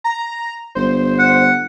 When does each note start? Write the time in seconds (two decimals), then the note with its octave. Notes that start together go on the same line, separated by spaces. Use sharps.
0.04 A#5
0.75 G1 C5
1.19 F#5